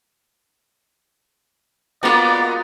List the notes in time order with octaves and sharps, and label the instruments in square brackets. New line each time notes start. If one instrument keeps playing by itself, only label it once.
[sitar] G#3 A#3 B3 [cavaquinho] F4 F#4 [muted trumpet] D5